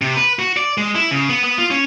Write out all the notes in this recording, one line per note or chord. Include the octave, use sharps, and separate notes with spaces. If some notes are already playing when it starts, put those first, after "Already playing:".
C3
B4
F#4
D5
G#3
E4
C#3
B3
B3
F4
C#4